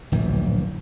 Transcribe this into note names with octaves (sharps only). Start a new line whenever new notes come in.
D1 A#1 F#2 E3